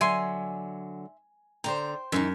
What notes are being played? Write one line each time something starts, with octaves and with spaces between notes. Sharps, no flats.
D3 F#3 E5 G#5 C6
D3 C5 G5 A#5
F#2 D#3 E3 D#4